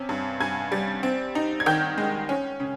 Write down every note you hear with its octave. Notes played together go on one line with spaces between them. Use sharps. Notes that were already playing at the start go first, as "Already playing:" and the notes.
Already playing: C3 C#4
G2
G2 G#5 G#6
G3
C4
D#4
G#6
D#3 G5 G6
G#3
C#4
C#3